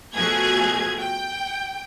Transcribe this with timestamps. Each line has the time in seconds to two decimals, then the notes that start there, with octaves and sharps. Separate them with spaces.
0.14 B2 F3 A3 F#4 G#4 G#6
1.01 G5